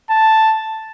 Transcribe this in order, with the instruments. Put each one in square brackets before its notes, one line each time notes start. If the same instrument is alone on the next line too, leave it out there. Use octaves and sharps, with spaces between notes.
[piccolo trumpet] A5